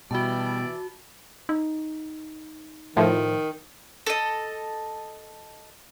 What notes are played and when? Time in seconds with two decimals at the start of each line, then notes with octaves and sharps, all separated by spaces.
0.11 B2 E3 G3 E4 F#4 D5 A5
1.49 D#4
2.97 A2 D#3 F3
4.06 A4 D#5